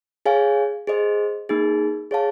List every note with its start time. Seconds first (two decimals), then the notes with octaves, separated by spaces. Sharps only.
0.26 G#4 C#5 F5 G#5
0.87 G#4 C5 D#5
1.49 A#3 D#4 G#4
2.11 G#4 C#5 F5 A5